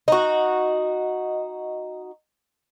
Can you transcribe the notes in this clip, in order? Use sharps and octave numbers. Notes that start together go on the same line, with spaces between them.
D#4 F#4 D#5